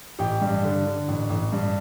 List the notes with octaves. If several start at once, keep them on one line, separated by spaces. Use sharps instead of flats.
A1 G4 G5
G2
D3
D3
A1
A1
G2